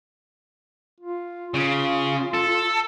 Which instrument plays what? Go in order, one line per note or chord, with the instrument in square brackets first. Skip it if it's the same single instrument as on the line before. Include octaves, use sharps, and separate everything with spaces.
[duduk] F4
[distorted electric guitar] C#3 [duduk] F4
[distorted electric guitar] A4